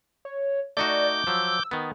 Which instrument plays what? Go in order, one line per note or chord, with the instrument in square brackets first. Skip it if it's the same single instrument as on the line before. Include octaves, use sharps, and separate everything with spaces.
[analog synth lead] C#5
[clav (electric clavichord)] A3 D#4 F#4 [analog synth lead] D5 [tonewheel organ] D6 G6
[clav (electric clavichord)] F3 F#3 [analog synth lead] E6
[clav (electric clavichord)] D#3 B3